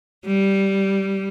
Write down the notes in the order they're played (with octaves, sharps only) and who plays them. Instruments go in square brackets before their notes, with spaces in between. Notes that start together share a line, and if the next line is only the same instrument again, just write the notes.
[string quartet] G3